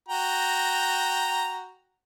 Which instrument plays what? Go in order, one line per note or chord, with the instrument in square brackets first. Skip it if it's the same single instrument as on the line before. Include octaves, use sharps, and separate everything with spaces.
[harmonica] F#4 G5 A#5